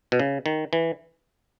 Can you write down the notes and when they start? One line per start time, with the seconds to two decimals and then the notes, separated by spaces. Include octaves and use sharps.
0.12 B2
0.20 C#3
0.46 D#3
0.73 E3